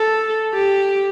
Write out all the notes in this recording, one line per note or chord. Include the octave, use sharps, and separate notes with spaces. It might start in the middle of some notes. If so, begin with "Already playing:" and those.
Already playing: A4
G4